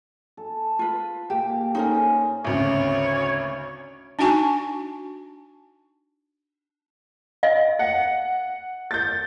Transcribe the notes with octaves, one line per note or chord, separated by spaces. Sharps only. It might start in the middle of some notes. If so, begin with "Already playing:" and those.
A4
F4 B4
A#2 G4
C#4 D#4 A4 A#4 C5
G#1 D2 C#3 C#5
D4 D#4 F#4 G#5 A5 C#6
D#5 F5
F#5
G6 A6